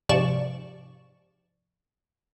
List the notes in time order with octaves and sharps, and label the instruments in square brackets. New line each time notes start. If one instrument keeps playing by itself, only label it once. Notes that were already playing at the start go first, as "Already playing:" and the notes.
[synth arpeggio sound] G#2 C3 F3 D5 C#6 E7